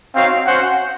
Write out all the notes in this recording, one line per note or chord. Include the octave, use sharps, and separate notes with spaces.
C4 D#4 F#4 C#5 F5
C#4 F#4 C5 F#5